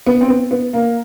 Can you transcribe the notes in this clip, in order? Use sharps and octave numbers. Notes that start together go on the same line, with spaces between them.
B3
C4
B3
B3
A#3